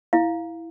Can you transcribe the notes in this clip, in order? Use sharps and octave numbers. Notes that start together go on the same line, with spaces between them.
E4 F5